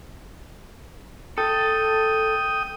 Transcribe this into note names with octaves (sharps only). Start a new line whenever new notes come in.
A4 G5 D#6